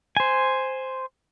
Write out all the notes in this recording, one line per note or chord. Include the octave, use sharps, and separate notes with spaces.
C5 G#5